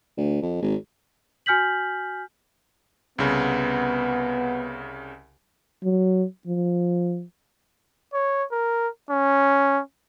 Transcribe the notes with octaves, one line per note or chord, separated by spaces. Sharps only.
D2
F2
G#1
F#4 G#5 F6 G6 B6 F#7
C2 C#3 B3
F#3
F3
C#5
A#4
C#4